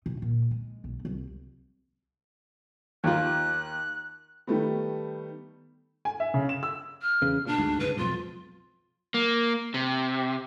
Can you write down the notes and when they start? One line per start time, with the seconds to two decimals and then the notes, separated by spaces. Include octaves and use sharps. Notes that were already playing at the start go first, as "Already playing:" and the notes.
0.06 C3
0.22 A#2
0.51 G#3
0.84 B1
1.05 C2
3.04 D#2 F4 F#6
4.47 D#3 G3 A3 B3
6.05 G#5
6.20 E5
6.34 C#3
6.49 E7
6.63 E6
7.01 F6
7.22 E2 C#3
7.46 A#2 D4
7.58 D2 G#2
7.80 C#2 G#2 B4
7.97 B1 F2 F4
9.14 A#3
9.74 C3